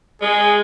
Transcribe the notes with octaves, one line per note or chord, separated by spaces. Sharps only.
G#3 G#4